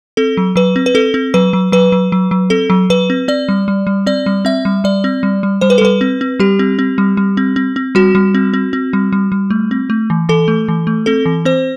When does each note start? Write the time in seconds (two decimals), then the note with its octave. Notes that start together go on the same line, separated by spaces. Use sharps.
0.17 C4 A4
0.37 F#3
0.56 F#3 B4
0.76 C4
0.86 B4
0.95 C4 A4
1.14 C4
1.34 F#3 B4
1.53 F#3
1.72 F#3 B4
1.92 F#3
2.12 F#3
2.31 F#3
2.50 C4 A4
2.70 F#3
2.90 F#3 B4
3.10 C4
3.28 C4 D5
3.49 G3
3.68 G3
3.87 G3
4.06 C4 D5
4.26 G3
4.45 C4 E5
4.65 G3
4.84 G3 D5
5.04 C4
5.23 G3
5.43 G3
5.61 G3 C5
5.70 B4
5.78 A4
5.81 G3 B4
6.01 C4
6.21 C4
6.40 G3 G4
6.59 C4
6.79 C4
6.98 G3
7.17 G3
7.37 C4
7.56 C4
7.76 C4
7.95 G3 F#4
8.15 G3
8.35 C4
8.54 C4
8.73 C4
8.93 G3
9.13 G3
9.32 G3
9.50 A3
9.71 C4
9.90 A3
10.10 E3
10.29 E3 A4
10.48 A3
10.68 E3
10.87 A3
11.06 C4 A4
11.26 E3
11.45 C4 C5